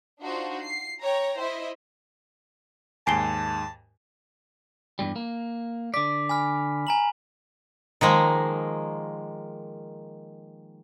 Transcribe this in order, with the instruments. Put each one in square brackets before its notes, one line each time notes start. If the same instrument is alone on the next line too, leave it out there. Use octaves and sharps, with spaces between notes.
[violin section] D4 D#4 F4 F#4 C5
C7
C#5 G5 A#5
E4 C5 D#5 E5
[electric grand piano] D#2 G#2 [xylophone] G#5 C7 G7 [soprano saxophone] A5
[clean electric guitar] E2 G2 G3
A#3
[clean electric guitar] D3 D5 [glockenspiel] B6
[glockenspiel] G#5 B5 F6
G#5 A#5 F#7
[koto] D#3 F3 G#3 A#3